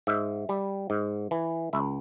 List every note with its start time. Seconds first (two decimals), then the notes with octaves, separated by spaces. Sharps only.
0.07 G#2 E5
0.49 G3
0.90 G#2
1.31 E3
1.73 C#2 E5